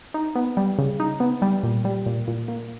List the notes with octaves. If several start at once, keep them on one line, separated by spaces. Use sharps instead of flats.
D#4
B3
G3
C#3
D#4
B3
G3
A#2
G3
A#2
A#2
A#3